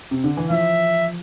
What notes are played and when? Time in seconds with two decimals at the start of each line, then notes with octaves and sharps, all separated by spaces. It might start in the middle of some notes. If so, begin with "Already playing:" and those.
0.11 C3
0.24 D3
0.37 E3
0.50 F3 E5